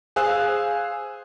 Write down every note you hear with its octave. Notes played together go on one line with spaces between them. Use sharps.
G#4 C5 F5 G#5 E6 F#6